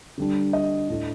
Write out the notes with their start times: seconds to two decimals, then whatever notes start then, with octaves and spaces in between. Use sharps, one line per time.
0.18 D3 G3 D4
0.53 D#5
0.89 A2 A3 D4